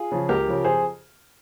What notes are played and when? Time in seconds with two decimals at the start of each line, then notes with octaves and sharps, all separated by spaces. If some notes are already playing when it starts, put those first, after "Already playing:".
Already playing: F4 G#4
0.11 C#3 F3
0.29 C#2 G4 A#4
0.47 C#3 F3
0.64 F2 G#4 C5